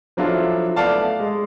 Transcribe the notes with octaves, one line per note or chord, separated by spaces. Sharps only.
F3 F#3 D4 E4 F4 A4
A3 B3 E4 D5 F5 A5
G#3